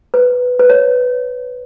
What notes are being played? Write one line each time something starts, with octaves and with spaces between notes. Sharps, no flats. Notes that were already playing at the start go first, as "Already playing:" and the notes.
B4
B4
C#5